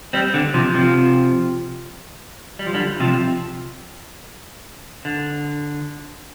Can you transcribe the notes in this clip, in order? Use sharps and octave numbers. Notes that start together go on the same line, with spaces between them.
G3 C4
D3
C3 F3
C3 F3
G3
F3
D3 G3
C3 F3
D3